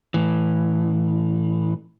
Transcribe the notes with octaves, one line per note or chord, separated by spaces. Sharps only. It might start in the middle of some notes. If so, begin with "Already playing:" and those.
A2 E3